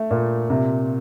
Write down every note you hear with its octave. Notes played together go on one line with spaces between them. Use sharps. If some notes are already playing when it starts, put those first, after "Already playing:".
Already playing: A3
A#2
C3